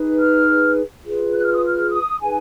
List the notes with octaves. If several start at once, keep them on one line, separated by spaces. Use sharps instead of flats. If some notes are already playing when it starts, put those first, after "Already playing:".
Already playing: D#4 G#4 B4
F6
F4 G#4 B4
F#6
F6
D#6
F6
D#6
D#4 G#4 B4 G#5